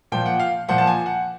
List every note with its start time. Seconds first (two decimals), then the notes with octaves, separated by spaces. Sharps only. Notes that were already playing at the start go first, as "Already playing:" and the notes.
0.12 A#2 F3 G5
0.26 F#5
0.40 F5
0.69 A#2 F3 F#5
0.78 A5
0.87 G#5
1.06 F#5